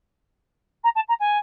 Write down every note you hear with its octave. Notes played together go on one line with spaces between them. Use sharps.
A#5
A5
A#5
G#5